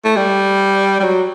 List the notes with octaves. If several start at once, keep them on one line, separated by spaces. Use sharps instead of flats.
A3
G3
G3
F#3